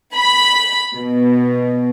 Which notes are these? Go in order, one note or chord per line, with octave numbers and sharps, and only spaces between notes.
B5
B2